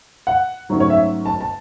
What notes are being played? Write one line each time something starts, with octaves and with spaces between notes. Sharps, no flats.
F#5
G#2 F#3 A3 C#4
C#5
E5
A5
A5